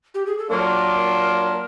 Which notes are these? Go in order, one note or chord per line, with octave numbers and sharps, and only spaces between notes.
G4
G#4
A4
F#3 A#3 D4 F4 A#4